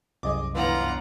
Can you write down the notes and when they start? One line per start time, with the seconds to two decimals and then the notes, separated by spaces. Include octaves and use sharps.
0.23 C2 F#2 G#4 D#5 D6
0.55 G1 E3 F4 B4 F#5 A#5